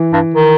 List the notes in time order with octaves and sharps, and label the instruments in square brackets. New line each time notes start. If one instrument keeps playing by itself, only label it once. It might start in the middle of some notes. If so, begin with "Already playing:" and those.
Already playing: [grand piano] E3
[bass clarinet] G2
D#3